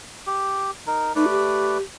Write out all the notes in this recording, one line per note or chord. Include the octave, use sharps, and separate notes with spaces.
G4
D#4 A#4
A3 D#4 B4 D5
G4